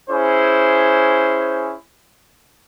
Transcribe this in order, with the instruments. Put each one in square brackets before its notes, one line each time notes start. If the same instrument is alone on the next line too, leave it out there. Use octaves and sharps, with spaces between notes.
[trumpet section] C#4 E4 G#4 C5